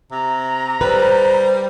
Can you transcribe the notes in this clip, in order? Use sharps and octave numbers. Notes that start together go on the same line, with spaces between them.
C3 A#5
G3 B4 C5